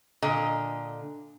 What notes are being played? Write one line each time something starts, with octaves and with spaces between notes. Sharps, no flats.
A#2 D3 D#5